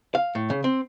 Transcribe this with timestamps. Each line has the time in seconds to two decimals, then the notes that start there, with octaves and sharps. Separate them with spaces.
0.15 F5
0.35 A2
0.50 C#3
0.64 C4